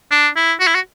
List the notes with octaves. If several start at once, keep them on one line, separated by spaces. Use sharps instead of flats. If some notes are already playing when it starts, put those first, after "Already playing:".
D4
E4
F#4
E4
F#4